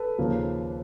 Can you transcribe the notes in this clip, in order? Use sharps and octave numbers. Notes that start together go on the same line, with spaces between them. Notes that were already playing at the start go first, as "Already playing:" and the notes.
Already playing: A4 B4
D#2 C#3 F3 A#3